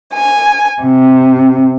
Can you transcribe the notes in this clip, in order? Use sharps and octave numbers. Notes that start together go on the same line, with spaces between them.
G#5
C3